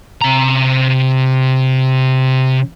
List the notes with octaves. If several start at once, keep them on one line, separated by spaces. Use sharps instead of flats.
C3 A#5